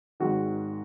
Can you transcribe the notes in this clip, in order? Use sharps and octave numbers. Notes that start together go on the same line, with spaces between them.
G#1 G#2 D#3 F#4